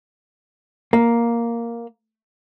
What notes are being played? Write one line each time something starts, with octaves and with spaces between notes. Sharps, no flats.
A#3